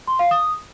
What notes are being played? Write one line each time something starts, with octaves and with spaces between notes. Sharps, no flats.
C6
F5
D#6